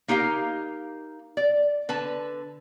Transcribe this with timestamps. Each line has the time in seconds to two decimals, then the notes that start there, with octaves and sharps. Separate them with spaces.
0.08 A#3 D#4 G4 A#4 F5
1.37 D5
1.89 D3 B4 A5